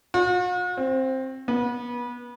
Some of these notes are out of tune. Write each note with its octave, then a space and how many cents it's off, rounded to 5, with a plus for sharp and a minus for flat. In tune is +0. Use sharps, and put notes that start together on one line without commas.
F#4 -45
C4 +10
B3 -30